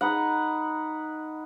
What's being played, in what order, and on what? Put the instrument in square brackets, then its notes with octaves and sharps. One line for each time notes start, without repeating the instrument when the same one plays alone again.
[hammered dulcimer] D#4 B4 F#5